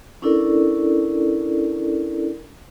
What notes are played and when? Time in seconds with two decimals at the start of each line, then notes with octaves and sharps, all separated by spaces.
0.22 C#4 D4 E4 A4 A#4 D5